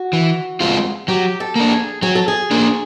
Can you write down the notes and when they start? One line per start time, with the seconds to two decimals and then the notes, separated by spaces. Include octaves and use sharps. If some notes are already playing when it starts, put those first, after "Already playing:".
Already playing: F#4
0.13 E3
0.60 G#3 C4 F4
1.08 F#3 G4
1.40 A4
1.56 A#3 D4
1.72 G#4
2.02 F#3 G#4
2.15 A4
2.28 G#4
2.51 A#3 D4